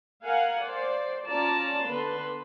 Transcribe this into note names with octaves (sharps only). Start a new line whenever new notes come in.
A#4 F5 F#5 G#5
C5 D5
C#4 F4 D5 A5 A#5
D3 B3 B4 C6